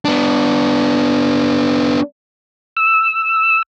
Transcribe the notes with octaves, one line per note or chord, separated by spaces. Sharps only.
B3 D4
E6